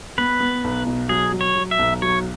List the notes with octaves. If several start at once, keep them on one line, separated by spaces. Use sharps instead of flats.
B3 B4
B3
B1
B2
F#3 G#4
F#3
C#5
F#3
E5
B1
F#3 C#5